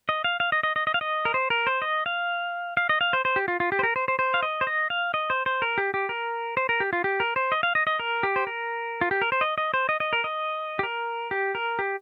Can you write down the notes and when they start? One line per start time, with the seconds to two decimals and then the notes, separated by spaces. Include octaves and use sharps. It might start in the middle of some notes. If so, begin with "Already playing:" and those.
0.09 D#5
0.24 F5
0.40 F5
0.52 D#5
0.63 D#5
0.76 D#5
0.87 D#5
0.94 F5
1.01 D#5
1.25 A#4
1.34 C5
1.50 A#4
1.67 C5
1.82 D#5
2.06 F5
2.77 F5
2.89 D#5
3.01 F5
3.13 C5
3.25 C5
3.36 G4
3.48 F4
3.60 F4
3.72 G4
3.79 C5
3.83 A#4
3.96 C5
4.08 C5
4.19 C5
4.34 F5
4.43 D#5
4.61 C5
4.67 D#5
4.90 F5
5.14 D#5
5.30 C5
5.46 C5
5.62 A#4
5.78 G4
5.94 G4
6.09 A#4
6.57 C5
6.69 A#4
6.80 G4
6.93 F4
7.04 G4
7.20 A#4
7.36 C5
7.52 D#5
7.63 F5
7.75 D#5
7.87 D#5
7.99 A#4
8.23 G4
8.36 C5
8.47 A#4
9.01 F4
9.11 G4
9.22 A#4
9.32 C5
9.41 D#5
9.58 D#5
9.74 C5
9.89 D#5
10.00 D#5
10.13 A#4
10.24 D#5
10.79 G4
10.83 A#4
11.31 G4
11.55 A#4
11.79 G4